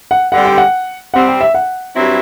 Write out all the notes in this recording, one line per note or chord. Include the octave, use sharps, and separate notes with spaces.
F#5
G2 D3 G3 C4 F#5
G5
F#5
C3 G3 C4 F#5
G5
E5
F#5
G2 F#3 C4 E4